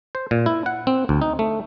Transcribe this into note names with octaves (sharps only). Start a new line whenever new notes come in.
C5
A#2
E4
F#5
C4
D2
D#4
A3